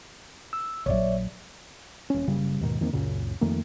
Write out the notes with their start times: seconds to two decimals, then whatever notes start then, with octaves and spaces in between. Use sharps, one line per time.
0.53 E6
0.86 A#1 F#3 C#5 D5 E5
2.10 D#1 C#4
2.27 F#1 C#3 G3
2.61 D#2 G#2 B2 D#3
2.81 E2 D#3 A#3 C4
2.93 C#2 F#2 A#2 C#3
3.41 F2 D#3 A3 A#3